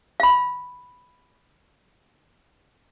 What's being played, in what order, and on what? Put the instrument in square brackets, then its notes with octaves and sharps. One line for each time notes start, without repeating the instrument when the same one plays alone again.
[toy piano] F5 B5